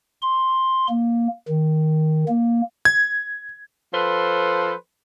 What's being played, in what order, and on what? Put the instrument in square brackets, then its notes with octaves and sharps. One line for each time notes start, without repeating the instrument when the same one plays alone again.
[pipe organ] C6
A#3
D#3
A#3
[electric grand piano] G#6
[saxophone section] F3 A4 B4 C5